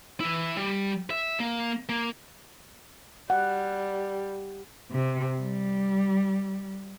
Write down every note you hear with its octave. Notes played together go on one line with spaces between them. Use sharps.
E3 E4
G3
E5
A#3
A#3
G3 F#5
C3
G3